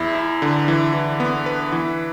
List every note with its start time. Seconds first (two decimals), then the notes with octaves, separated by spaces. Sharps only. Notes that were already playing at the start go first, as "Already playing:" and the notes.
Already playing: E2 E4
0.15 E4
0.42 D3
0.68 E3
0.94 E3
1.20 B3
1.46 B4
1.72 E3